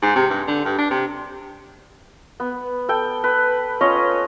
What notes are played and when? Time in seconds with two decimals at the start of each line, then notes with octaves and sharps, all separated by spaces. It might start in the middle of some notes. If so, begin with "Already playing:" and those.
0.02 G#2
0.16 C3
0.30 G2
0.48 D3
0.65 G2
0.78 D4
0.91 C3
2.40 B3
2.89 A4 G5
3.24 B4
3.81 C#4 F4 C#5 D#5